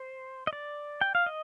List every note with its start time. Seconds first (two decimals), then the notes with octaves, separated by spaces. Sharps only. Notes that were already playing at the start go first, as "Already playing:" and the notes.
Already playing: C5
0.47 D#5
0.53 D5
1.01 G5
1.15 F5
1.26 D#5